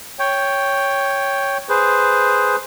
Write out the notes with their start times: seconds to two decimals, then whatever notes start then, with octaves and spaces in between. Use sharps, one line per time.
0.19 C#5 G5
1.69 G#4 B4 C5